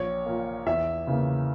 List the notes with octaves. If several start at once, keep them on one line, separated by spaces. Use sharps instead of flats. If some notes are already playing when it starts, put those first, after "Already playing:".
Already playing: A#1 C#5
A#2 A#3
E2 E5
C#3 E3 A#3